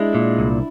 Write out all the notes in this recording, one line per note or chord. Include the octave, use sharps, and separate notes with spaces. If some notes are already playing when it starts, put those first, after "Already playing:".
Already playing: G#3 D4 E4
A#2
C2